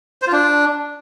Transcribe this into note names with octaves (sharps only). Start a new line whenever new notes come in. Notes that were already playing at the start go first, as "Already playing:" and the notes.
C5
F4
D4